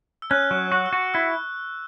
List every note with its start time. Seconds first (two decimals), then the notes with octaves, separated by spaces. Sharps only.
0.22 E6
0.31 C#4 F#6
0.51 F#3
0.58 C#6
0.72 F#4
0.86 E6
0.93 F#4
1.14 E4 E6